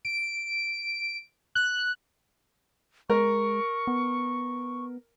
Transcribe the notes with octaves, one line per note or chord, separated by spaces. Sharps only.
D7
F#6
G#3 A#4 C#6
B3